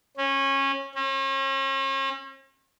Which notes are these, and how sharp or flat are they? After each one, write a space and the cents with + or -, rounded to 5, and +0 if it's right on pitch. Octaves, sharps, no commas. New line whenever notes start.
C#4 -20
C#4 -40